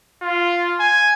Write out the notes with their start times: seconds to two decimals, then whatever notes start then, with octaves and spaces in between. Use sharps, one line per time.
0.22 F4
0.80 G#5